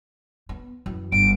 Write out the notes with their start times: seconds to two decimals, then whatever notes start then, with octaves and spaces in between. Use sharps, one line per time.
0.49 B3
0.86 F#2 E3
1.12 G1 D7